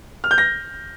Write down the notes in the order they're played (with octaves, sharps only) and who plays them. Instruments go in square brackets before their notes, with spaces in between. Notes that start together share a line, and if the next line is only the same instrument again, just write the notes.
[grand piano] F6
G6
A#6